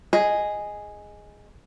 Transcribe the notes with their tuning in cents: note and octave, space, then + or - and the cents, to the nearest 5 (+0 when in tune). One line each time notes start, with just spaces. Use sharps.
G#4 +0 D#5 +0